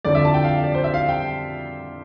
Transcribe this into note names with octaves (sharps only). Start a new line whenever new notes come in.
F2 D3 D5
E5
A5
G5
F5
D5
C5
E5
F5
G5